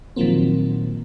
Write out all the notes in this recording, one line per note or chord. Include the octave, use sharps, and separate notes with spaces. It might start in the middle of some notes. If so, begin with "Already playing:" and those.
A#2 D#3 F3 F#3 A#3 C4